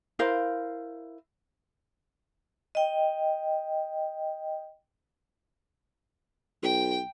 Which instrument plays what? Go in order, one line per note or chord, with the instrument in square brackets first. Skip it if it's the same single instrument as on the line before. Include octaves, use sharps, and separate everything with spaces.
[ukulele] E4 A#4 C5 F5
[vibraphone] D#5 G5
[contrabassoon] B1 [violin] G5